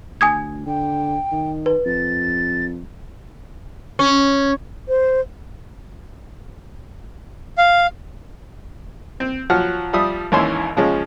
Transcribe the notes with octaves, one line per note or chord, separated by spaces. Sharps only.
D2 G#5 D#6 G#6
D3 G5
D#3
B4
F2 A6
C#4
C5
F5
C4
F3 F#3 F#5 F6
F3 G3 E5 D#6
G#1 D#2 E3 C#4 E4 C6
C#3 F3 G#3 C#4